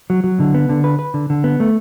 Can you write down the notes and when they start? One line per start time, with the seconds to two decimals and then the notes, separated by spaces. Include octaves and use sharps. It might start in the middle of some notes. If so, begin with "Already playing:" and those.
0.10 F#3
0.24 F#3
0.40 D3
0.54 B3
0.69 D3
0.84 B4
0.99 B4
1.14 D3
1.30 D3
1.44 B3
1.60 A3